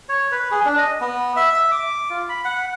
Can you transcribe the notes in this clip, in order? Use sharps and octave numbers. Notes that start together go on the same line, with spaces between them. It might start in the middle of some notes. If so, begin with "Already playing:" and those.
C#5
B4
G#4
D4
D#5
B3
E5
E5
D6
F4
B5
F#5